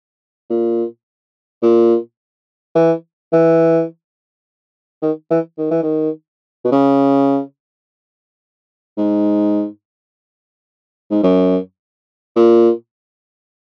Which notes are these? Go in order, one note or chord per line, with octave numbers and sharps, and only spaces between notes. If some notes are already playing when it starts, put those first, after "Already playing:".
A#2
A#2
E3
E3
D#3
E3
D#3
E3
D#3
B2
C#3
G#2
G#2
F#2
A#2